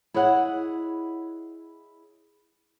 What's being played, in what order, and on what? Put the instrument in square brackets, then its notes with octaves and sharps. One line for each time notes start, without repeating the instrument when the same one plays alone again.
[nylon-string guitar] E4 G#4 C#5 D#5 F#5